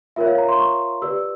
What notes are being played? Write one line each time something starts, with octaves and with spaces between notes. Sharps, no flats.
F4 A#4 C#5 E5
F5
A#5
C6
C#6
G4 B4 D5 E6